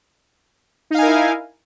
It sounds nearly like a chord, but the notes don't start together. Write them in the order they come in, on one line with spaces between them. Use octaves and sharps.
D#4 F5 G#5 A#4 E4